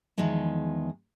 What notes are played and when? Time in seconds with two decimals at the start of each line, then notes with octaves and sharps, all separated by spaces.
0.18 E2 D#3 F3 G#3 D#4